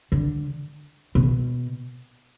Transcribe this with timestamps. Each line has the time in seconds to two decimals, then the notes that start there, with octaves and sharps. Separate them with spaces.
0.12 D3
1.15 B2